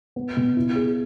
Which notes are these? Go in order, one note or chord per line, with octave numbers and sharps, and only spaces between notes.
B3
B2
E4
G#4